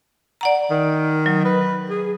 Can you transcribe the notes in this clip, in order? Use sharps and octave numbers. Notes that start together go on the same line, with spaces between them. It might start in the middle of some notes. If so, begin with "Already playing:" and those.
D5 F#5 A#5
D#3
F#3
B4
G#4